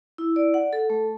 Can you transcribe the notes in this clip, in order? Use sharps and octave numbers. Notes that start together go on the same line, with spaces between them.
E4
D5
F#5
A4
A3